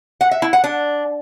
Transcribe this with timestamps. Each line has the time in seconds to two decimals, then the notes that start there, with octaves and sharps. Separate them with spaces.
0.21 F#5
0.31 E5
0.42 E4
0.53 F#5
0.64 D4